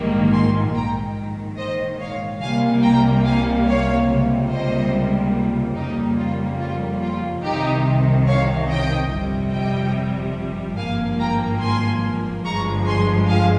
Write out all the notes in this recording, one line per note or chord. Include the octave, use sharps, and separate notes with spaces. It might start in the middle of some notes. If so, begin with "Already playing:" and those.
Already playing: A#1 G#2 D#3 G3 A#3
G#5 C6
A#1 G#2 D#3 G5 A#5
C5 D#5
C#5 F5
C2 C3 G3 A#3 F5 G#5
G5 A#5
F5 G#5
C#5 F5
C#2 C3 G3 A#3
C5 D#5
F2 C#3 G3 A#3 D#4 G4
F4
F4
F4
C2 C3 D#3 D#4 G4
C#5 F5
D#5 G5
G1 F2 C3 G3
D#5 G5
G#1 G2 F3 A#3 F5 G#5
G5 A#5
G#5 C6
G1 G2 F3 G#3 A#5 C#6
G#5 C6
F5 G#5